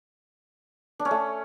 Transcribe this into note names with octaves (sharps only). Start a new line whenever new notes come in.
D4
C#4
A3